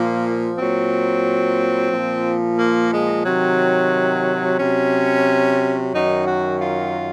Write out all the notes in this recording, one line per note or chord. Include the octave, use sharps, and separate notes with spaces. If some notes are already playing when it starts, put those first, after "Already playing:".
Already playing: A#2 F3 A#3
A#2 F#3 C4
A#2 F3
A#3
G#3
C3 D#3 F#3
C3 F#3 C#4
F#2 D#3 F#3 D#4
F#4
F4